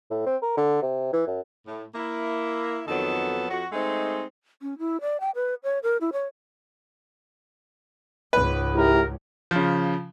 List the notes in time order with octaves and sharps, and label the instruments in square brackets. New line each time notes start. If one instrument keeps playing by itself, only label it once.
[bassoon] A2
C4
A#4
D3
C3
E3
F#2
[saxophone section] A2
A#3 E4
F2 D#3 F#3 B3 A4
F2 F#4
G#3 A3 C4 D#4
[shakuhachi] C#4
E4
D5
G5
B4
C#5
A#4
E4
C#5
[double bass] C#2 G#2 [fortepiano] B4
[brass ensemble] E4 G4 A#4
[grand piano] C#3 F3